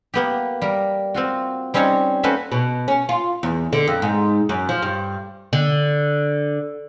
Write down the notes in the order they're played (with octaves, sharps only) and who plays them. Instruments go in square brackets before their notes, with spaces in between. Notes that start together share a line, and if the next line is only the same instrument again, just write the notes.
[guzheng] A#3 B3 G4
G3 A#4
C4 F4 F#4
G3 C4 C#4 D#4 C#5
A3 A#3 C#4 F#4 B4 C5
[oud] B2
C#4
F4
E2
D3
F2
G#2
F#2
F3
G2
D3